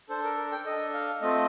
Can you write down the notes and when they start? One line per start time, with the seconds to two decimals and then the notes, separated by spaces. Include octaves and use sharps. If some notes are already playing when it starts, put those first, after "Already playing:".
0.09 D4 A4 C5
0.24 A#4
0.37 A#4
0.52 G5
0.66 D4 A4 D#5
0.93 F5
1.21 A3 C4 F4 A4 D#5